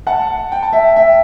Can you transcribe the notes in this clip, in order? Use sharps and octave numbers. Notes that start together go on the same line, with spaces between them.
F#5 A5
G5
A5
E5 G5
E5 G5